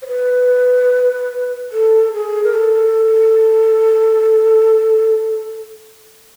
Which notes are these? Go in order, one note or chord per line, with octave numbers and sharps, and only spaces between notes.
C5
B4
A4
G#4
A#4
A4